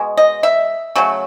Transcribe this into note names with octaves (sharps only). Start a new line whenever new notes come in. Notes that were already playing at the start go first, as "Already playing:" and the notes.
Already playing: B2 G#3
D#5
E5
C#3 F#3 A3